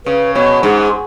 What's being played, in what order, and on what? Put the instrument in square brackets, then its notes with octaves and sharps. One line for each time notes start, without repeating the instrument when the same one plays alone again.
[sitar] C#3 [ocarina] B4
[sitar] B2 [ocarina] C#5
[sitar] G#2 [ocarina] G#4